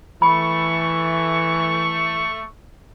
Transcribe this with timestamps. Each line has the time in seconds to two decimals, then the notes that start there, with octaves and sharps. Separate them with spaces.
0.22 E3 A3 B5 C#6